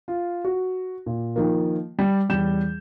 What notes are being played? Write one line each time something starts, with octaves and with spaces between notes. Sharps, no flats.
F4
F#4
A#2
D#3 F3 A#3
G3
E2 G3 G6 E7